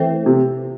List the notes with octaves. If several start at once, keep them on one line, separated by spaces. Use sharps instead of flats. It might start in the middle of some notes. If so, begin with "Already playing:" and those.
Already playing: E3 A3 C4
C3